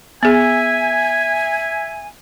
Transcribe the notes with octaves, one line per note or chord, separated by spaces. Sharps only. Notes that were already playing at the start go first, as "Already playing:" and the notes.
B3 G#4 E5 G#5